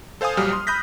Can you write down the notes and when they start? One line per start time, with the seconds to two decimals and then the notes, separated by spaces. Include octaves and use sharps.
0.21 A4 C5 F5 G#5 D#6
0.37 A#1 F#3 G3 G4 F6
0.53 C6
0.67 B5 D#6 F#6 G6 A#6 B6